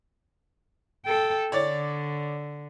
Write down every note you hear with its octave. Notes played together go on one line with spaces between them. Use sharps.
A4 G5
D3 C#5 D5 A6